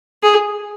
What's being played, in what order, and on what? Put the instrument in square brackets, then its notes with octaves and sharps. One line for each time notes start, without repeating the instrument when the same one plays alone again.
[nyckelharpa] G#4